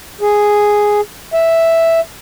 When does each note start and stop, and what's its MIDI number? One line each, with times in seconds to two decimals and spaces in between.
0.21 1.01 68
1.34 2.00 76